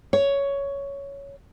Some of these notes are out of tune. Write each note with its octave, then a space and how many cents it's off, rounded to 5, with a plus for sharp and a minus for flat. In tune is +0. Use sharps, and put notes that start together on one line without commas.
C#5 +10